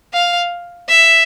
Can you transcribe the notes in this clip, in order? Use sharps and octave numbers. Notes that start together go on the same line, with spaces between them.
F5
E5